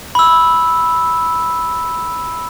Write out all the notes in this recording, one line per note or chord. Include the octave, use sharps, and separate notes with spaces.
B5 E6